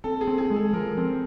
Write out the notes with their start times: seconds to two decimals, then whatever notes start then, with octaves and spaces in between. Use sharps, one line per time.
0.04 C4 A4
0.21 G#4
0.27 C4
0.38 G#4
0.50 G#3
0.56 A4
0.73 F3 A#4
0.97 C4 A#4